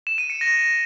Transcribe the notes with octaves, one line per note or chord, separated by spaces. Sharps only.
E7
D#7
C#7
A#6